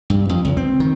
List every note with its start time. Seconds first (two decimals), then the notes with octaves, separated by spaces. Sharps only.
0.10 G2
0.29 F2
0.45 C#2
0.57 C4
0.80 D#3